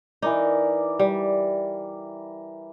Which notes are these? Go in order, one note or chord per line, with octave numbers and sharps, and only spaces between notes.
E3 D#4 A#4 D5
G3